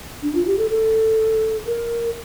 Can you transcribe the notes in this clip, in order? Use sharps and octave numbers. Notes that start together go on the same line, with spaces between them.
D4
F4
G4
A4
A4
A#4